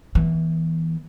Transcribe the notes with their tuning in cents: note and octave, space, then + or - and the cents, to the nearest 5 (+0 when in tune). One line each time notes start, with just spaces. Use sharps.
E3 -20 B3 -40